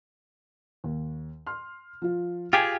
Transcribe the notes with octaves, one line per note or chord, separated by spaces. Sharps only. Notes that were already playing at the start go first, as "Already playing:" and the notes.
D#2
C6 F6
F3 F4
F4 G4 G#4 G5 G#5 G#6